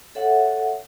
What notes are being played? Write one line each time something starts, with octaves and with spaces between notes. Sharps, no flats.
A4 C#5 E5 F#5